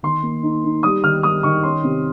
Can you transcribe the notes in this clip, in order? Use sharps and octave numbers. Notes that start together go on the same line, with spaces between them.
D#3 C6
A#3
D#4
D#4
G3 D#6
D#3 F6
G3 D#6
D#3 C#6
C#4 C6
C3